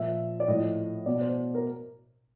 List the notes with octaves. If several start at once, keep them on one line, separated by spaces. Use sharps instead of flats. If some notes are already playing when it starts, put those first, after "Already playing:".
Already playing: A#2 F3 E5
D5
A2 F3 D#5
B2 D5
C5
A#4